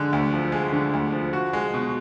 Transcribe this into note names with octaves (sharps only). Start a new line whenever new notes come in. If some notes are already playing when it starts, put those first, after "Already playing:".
Already playing: D3 G#3
D2
F3
G#3
D3
D2
F3
F#4
G#3
B2